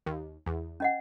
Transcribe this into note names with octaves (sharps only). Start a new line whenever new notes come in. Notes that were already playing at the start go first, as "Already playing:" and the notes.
D#2
E2
C#4 D#5 F#5